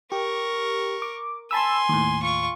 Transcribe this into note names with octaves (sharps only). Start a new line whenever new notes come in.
G4 A#4 C#6
D6
G#5 A5 B5 C6 E6
D#2 A2
F4 C#6